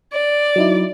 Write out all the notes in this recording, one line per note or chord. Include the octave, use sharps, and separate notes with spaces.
D5
F#3 D#4 E4